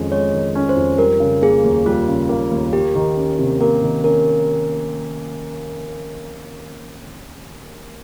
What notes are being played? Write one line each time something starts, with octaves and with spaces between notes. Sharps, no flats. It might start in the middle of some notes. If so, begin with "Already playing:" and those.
Already playing: F2 D#3 G#3 C#4
G#3 C#5
D#3
C#4
C5
F2
G3 A#4
C#3
A#3 G#4
D#2
G3 F4
C#3
A#3
D#2
A#3 G4
D#3
C#4
C3
A#3 A#4
D#3
C#4 A#4